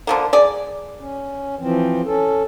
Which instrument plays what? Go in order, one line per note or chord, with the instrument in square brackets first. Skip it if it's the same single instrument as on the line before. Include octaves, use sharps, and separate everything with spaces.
[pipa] D3 F3 A#3
G#4 D5
[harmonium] C#4
E3 F3 C4
C#4 A4